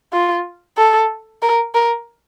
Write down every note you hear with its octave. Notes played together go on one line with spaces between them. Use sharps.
F4
A4
A#4
A#4